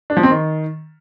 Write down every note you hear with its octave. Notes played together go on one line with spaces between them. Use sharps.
D4
F3
C4
D#3